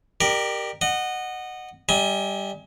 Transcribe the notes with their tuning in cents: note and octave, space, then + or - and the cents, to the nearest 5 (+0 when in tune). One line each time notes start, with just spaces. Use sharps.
G4 +0 A#4 +0 D5 +40
D#5 -20 F#5 +0
G3 +0 D#5 +40 G#5 +0